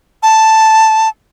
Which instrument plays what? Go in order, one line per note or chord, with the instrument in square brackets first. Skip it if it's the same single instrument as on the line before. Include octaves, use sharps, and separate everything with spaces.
[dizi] A5